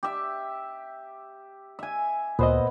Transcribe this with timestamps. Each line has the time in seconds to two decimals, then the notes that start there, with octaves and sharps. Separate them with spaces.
0.03 G4 E5
1.79 E5 G#5
2.39 D2 A#2 B3 C5 D#5